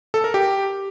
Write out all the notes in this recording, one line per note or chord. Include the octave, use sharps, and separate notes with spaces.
A4
A#4
G4